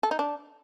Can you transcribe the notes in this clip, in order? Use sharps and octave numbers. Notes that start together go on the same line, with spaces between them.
A4
D#4
D4